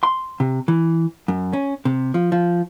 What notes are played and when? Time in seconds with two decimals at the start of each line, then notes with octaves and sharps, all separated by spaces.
0.03 C6
0.40 C3
0.68 E3
1.28 F#2
1.53 C#4
1.85 C3
2.14 F3
2.32 F3